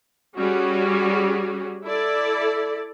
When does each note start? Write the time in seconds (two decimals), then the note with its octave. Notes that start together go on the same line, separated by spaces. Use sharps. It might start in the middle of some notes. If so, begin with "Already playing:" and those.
0.36 G3 C#4 F#4 G#4
1.85 E4 A4 D5